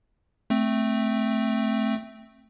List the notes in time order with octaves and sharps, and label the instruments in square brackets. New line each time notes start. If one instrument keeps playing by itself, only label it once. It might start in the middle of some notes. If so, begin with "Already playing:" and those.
[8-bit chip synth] A3 C4